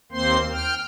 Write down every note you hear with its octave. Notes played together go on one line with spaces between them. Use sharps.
D#2 A#3 C4 C5 C6
G5 F6